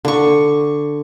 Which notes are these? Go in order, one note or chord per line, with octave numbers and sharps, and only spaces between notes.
D3 C#6